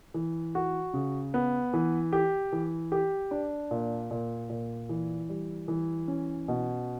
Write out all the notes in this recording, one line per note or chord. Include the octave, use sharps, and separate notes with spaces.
E3
F#4
C#3
B3
E3
G4
E3
G4
D4
A#2
A#2
A#2
E3
G3
E3
C#4
B2